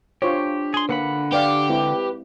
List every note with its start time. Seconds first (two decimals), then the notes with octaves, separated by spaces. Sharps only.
0.22 D4 F4 G4 C5 C#5
0.74 G#4 C6
0.89 D3 A#3 B4 F#5 B5
1.32 G4 B4 D5 F5
1.69 G#3 C4 E4 B4